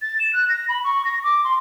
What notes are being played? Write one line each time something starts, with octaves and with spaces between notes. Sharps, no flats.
A6
E7
F#6
A#6
B5
C#6
A#6
D6
C6